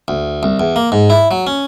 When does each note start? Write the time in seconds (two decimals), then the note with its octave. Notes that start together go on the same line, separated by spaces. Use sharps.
0.08 D2
0.43 C2
0.60 E2
0.76 A#3
0.92 G#2
1.10 E4
1.31 F#3
1.47 C#4